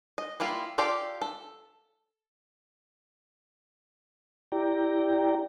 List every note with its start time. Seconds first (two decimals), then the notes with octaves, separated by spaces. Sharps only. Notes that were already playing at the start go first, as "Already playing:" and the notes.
0.18 D#5
0.40 G3 A#3 E4 F4
0.78 F4 G4 A4 D5 F5
1.22 A4
4.52 E4 G4 D5 G5 A#5